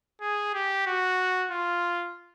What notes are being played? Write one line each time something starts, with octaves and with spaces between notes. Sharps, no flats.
G#4
G4
F#4
F4